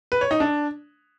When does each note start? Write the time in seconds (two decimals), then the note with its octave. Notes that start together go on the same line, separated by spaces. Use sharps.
0.12 B4
0.21 C#5
0.31 D#4
0.40 D4